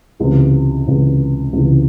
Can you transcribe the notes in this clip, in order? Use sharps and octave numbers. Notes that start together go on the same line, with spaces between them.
C#2 C3 E3
C#2 C3 E3
C#2 C3 E3